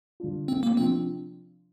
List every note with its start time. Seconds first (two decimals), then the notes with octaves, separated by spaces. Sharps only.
0.20 D3 G3 D4 F4
0.48 C4
0.63 A#3
0.77 C3 F3 C4 D4 F4